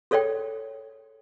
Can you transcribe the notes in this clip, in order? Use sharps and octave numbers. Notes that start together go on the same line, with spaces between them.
G#4 A4 C#5 D5 G5